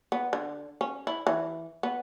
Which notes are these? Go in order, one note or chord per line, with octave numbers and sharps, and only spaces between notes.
B3
D3
C#4
E4
E3
B3